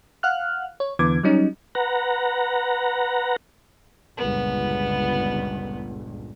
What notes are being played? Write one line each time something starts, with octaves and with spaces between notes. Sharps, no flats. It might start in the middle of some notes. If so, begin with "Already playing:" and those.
F5 F#5 F6 F#6
C#5
E2 D3 E3 B3 D6 G#6
F#3 G3 C#4 D#4
B4 F#5 A#5
G1 C#2 A#2 B3